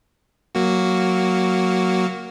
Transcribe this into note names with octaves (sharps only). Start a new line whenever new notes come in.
F#3 A#3 F#4